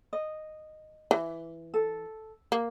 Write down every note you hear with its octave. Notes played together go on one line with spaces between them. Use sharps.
D#5
E3
A4
A#3